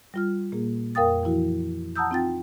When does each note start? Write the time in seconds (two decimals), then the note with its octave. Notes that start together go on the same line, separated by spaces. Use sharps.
0.14 G3 F4 F6
0.52 A#2 A#3 G#4
0.95 F2 A#4 F5 G5 D#6 A6
1.23 E3 F3 E4 F#4
1.96 F#5 A5 A#5 D#6 E6 G6
2.11 C4 D#4 F4 G5 A6